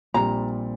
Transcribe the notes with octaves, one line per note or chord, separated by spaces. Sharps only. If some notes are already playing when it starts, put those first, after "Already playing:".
A#1 A#2 G3 C4 A#5